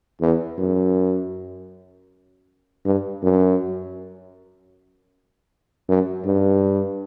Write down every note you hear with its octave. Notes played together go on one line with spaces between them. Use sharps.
E2
F#2
G2
F#2
F#2
G2